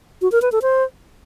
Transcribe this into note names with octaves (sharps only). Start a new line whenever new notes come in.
F#4
A#4
B4
A4
C5